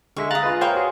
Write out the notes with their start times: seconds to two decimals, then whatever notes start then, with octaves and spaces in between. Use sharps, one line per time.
0.17 D3 G#3 E5 C#6
0.31 F5 A#5 D#6 F#6 A6
0.43 F4 G#4 B4
0.61 A#4 C5 C#5 F5 G5 C6
0.75 F#4 G#4